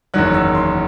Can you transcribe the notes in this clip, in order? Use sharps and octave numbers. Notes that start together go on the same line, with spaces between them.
F#1 E2 D#3 F#3 F#6
E6
C6